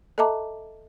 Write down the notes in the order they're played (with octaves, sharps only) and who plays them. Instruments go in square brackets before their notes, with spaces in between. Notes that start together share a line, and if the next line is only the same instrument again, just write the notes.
[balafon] A4 D#5 E5 A5 A#5 D6